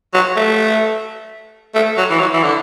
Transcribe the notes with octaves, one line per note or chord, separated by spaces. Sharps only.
F#3
A3
A3
F#3
E3
F#3
E3
D3